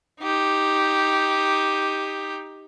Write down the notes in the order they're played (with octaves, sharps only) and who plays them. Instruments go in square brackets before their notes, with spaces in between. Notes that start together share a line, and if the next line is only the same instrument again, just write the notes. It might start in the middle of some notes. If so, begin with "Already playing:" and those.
[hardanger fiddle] D#4 G4